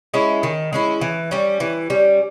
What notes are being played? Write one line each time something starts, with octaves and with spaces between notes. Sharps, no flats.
G#3 C#4 E4
D#3
G#3 C#4 E4
E3
G3 C#4
E3
G3 C#4